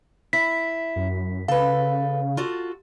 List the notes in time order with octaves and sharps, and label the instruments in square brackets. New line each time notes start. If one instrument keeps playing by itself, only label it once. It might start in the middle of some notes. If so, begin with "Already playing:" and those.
[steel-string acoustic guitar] E4 [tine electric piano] B6
[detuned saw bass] F#2
[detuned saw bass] C#3 [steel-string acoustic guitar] A4 B4 [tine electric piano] F5
[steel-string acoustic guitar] F4 F#4 A4